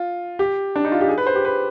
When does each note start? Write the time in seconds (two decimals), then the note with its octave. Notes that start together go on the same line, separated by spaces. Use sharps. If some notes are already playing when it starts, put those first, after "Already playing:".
Already playing: F4
0.39 G4
0.76 D4
0.85 D#4
0.92 F4
1.01 G4
1.09 G#4
1.18 B4
1.27 C5
1.35 G4
1.45 B4